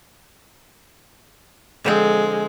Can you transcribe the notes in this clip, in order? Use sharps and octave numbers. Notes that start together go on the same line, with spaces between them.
D3 F3 G#3 C4